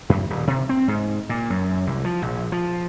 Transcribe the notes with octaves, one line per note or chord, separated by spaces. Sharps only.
F#2
D#1
C3
C4
G#2
A#2
F#2
C2
F3
A#1
F3